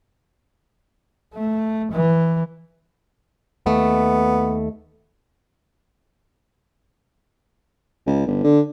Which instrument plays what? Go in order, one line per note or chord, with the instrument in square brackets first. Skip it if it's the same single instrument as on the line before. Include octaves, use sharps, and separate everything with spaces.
[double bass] A3
E3
[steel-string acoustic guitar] D#2 A3 [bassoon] B3
[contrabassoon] C#2
G1
D3